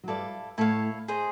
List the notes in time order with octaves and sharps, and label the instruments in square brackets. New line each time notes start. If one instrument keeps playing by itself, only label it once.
[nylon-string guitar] F#3
[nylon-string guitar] G2 G3 [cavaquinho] E4 A4 D5 F5
[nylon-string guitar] A2 A3 [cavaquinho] E4 A4 C#5 F5
[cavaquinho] G#4 C5 D#5